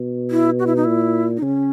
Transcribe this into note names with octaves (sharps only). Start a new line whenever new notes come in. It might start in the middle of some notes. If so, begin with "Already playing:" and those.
Already playing: B2
E4
F#4
E4
D#4
A#2 E4
D#4
C#3 C#4